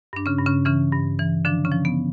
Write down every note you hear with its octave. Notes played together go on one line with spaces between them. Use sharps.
G2 D4
C#3 C#4
G2
C#3 C#4
C#3 E3 C#4
G2
E3
D3 F3 D4
C#3 C#4
F3
B3